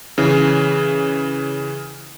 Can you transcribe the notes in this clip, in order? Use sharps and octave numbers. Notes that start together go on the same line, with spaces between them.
C#3 E3